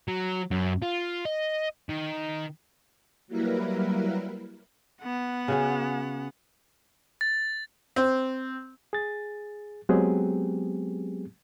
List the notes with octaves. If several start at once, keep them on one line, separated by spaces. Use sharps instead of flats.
F#3
F#2
F4
D#5
D#3
F#3 G3 A#3 E4 A#4 B4
B3 F#5
C#3 F#4 G#4
A6
C4
G#4 A6
F#3 G#3 B3 C4 G4 G#4